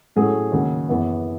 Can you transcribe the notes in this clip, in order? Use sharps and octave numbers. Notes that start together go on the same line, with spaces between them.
A2 F#3 A3 C#4 G#4
D#2 C#3 F#3
F#2 E3 B3